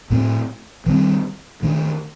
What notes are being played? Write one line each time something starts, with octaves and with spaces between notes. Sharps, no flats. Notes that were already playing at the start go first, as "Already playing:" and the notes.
A2 A3 C4
D#3 G3 C4
D#3 A3 D4